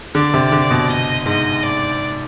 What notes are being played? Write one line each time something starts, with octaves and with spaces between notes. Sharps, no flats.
D3 D5
C3
D3
B2
B2 D#5
G#2 D#5
D5